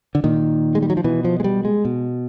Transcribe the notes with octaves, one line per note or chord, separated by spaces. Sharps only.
D3
A#2 D#3
G#3
G3
F#3
F3
B2 E3
F3
G#3
G3
G#3
B2